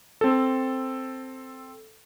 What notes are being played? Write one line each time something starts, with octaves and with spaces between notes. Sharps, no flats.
C4 A4